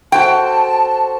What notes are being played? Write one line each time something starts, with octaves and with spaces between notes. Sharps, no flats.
F#4 A4 C5 G5 A5